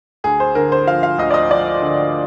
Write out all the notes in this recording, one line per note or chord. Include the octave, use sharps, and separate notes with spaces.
D2 G#4
C5
D3 A#4
C5
F3 F5
F5
D2 D#5
D5
D#5
F3 D5
D3